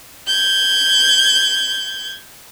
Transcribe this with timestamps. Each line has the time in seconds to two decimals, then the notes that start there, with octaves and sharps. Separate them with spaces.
0.27 G6 G#6